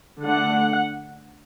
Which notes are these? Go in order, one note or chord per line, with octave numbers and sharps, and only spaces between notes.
D3 A3 D4 F#5